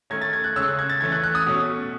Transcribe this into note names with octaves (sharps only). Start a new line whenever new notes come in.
D#3 A3 C#4 G#6
A6
G#6
F#6
C#3 G#3 C#4 E6
F#6
G#6
A6
E3 A3 C#4 G#6
F#6
F#6
D#6
B2 A3 C#4